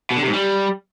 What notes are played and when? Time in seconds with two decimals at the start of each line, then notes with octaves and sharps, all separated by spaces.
0.11 B2
0.16 D3
0.22 C3
0.28 G#2
0.33 G3